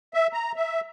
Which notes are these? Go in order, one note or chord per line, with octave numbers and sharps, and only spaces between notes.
E5
A#5
E5